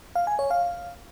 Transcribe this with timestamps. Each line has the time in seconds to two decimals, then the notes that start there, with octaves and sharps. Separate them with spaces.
0.15 F5
0.27 G#5
0.39 C#5
0.50 F5